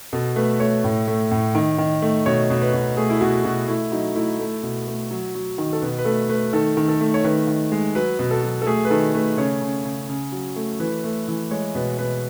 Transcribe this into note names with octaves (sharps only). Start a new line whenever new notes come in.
B2 A4
A3 B4
A3 C#5
A2
A3
A2
D#3
D#3
A3
B2 C#5
B2
B4
B2
A3 G#4
E4
B2 F#4
B2 F#4
A3 E4
F#3 D#4
A3 E4
A3
B2
A3
F#3
F#3
D#3
A4
B2 B4
B4
A3 A4
A3 B4
D#3 A4
D#3
A4
A3
C#5
D#3 B4
D#3
G#3
F#3 B4
B2
A4
F#3
A4
A3 G#4
B4
D#3 A4
A3 B4
C#3 C#5
C#3
C#3
C#3
F#3
A3
E3 B4
A3
E3
G#3 C#5
B2 B4
B2 B4